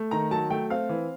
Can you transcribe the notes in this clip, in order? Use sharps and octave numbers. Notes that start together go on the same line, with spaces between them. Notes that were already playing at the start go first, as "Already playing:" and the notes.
Already playing: A3
D#3 A#5
F#3 A5
A3 G5
C4 F5
E3